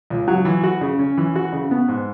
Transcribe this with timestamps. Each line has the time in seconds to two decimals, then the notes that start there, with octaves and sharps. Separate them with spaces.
0.10 C#2
0.28 F#3
0.45 E3
0.63 F#4
0.81 C#3
0.99 C#4
1.18 E3
1.36 F#4
1.53 C#3
1.71 B3
1.88 G#2